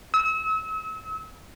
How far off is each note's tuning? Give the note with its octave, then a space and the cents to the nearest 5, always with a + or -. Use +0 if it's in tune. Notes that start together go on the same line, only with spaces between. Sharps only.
E6 -40